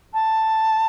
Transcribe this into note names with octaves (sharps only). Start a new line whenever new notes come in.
A5